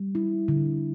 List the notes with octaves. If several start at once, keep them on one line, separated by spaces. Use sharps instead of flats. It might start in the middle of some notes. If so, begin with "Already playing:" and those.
Already playing: G3
E4
D3